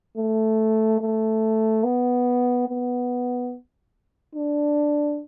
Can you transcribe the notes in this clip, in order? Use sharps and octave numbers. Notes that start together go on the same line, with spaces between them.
A3
A3
B3
B3
D4